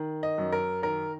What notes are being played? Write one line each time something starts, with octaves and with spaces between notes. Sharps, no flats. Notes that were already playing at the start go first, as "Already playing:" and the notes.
Already playing: D#3
D#5
F#2
A#4
D#3 A#4